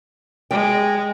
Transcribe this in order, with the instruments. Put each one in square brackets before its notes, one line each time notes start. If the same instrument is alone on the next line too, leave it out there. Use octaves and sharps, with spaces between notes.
[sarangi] G#3 [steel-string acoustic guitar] G5